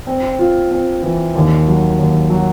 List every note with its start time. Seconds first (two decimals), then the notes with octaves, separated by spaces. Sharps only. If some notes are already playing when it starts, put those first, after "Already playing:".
0.07 C4
0.39 F4
0.71 C4
1.03 E3
1.35 D#2
1.67 F#3
1.99 D#2
2.30 F#3